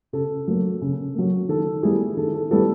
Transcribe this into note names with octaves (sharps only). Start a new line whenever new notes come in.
C#3 A4
F#3 A#3
C#3
F#3 A#3
D#3 A4
G3 B3 E4 G#4
D#3 A4
A4
G3 B3 E4 A4